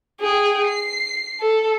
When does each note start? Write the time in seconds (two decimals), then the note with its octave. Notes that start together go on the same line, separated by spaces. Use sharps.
0.21 G#4 G5
0.67 C7
1.40 A4